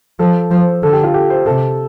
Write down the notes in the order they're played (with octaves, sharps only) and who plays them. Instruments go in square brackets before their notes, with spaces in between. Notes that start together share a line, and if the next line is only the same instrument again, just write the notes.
[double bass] F3 [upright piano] A4
[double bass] F3 [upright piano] C5
[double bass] D3 [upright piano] A4
[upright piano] G4
F4
G4
C5
[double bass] C3 [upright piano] A4